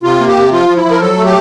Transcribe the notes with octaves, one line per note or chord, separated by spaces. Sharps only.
C3 F4
A#3
G4
C3
F3 F4
F3
E4
F3
A#4
F#3 A4
A3
G4